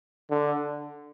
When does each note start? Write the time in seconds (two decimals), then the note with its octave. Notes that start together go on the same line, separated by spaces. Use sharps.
0.30 D3